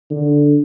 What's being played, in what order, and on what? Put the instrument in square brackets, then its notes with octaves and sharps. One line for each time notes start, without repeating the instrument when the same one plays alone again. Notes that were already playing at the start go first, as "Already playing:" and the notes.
[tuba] D3